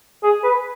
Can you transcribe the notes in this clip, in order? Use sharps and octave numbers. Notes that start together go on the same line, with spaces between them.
G#4
B4